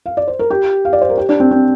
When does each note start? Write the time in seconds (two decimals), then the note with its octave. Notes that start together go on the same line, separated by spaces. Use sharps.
0.06 F5
0.17 D5
0.28 C5
0.39 A#4
0.50 G4
0.85 F5
0.93 D5
1.01 C5
1.09 A#4
1.17 G4
1.29 D4
1.40 C4
1.51 C4